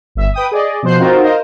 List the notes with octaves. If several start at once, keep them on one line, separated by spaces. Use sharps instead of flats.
G1 E5
B4 G5 D#6
G#4 D5 D#5
B2 F3 C5 F#6 C7
C4 D#4 F4 F#4 A#4 C5
A#4 C5 D#5 F5